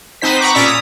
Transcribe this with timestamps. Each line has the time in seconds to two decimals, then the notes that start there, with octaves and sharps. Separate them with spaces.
0.22 B3 C4 D#4 C5 B6
0.40 F#5 A#5 B5 C#6 D6
0.54 A#2 C#4 D5 A#5 E6 B6
0.66 D#6